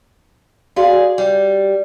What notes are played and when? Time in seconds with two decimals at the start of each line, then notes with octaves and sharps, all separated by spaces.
0.76 F#4 G#4 D5 F5
1.18 G3